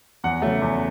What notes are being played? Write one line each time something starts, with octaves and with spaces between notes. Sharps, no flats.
E2 F#5
C#3 F#3 A3
E2